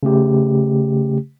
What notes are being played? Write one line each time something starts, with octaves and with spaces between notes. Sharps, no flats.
C#3 A3 G4